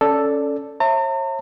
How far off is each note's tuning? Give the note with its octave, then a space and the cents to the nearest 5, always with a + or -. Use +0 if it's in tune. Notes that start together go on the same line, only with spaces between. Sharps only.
C#4 +0 A4 +0 D5 +0
C#5 -45 E5 +0 A#5 -45